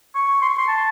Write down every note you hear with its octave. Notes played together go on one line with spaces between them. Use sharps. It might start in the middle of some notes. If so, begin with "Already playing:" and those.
C#6
C6
C#6
C6
A5